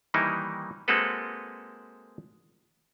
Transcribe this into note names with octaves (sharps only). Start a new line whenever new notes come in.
D#3 E3 G3 A#3 D#4 E4
G#3 A#3 C4 F#4 A4 B4